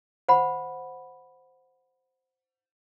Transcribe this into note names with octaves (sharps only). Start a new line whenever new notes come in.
C5 F#5 B5